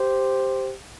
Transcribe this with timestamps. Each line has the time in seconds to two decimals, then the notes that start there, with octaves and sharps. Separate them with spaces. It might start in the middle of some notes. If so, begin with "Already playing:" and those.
Already playing: G4 C5